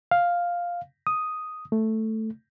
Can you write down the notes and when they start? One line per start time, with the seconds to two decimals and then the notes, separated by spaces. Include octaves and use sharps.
0.11 F5
1.07 D#6
1.72 A3